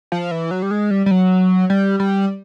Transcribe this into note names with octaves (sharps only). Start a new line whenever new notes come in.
F3
E3
F#3
G3
G#3
G3
G3
F#3
G3
G3